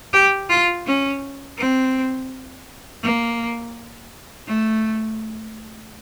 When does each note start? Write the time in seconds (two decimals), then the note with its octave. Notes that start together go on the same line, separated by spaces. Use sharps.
0.13 G4
0.49 F4
0.86 C#4
1.57 C4
3.02 A#3
4.47 A3